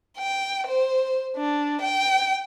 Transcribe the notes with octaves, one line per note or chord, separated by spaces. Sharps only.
G5
C5
D4
G5